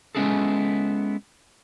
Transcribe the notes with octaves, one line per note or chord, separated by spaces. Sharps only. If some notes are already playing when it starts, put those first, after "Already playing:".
G#3 B3 C#4 E4 G#4 A4